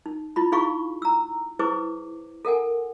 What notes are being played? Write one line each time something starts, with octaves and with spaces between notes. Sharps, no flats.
D#4
E4 F4 B5
D#4 E4 G#4 F5 B5 C#6
A#5 E6
E4 G#4 B4 C5 D6
A4 A#4 F#5 G#5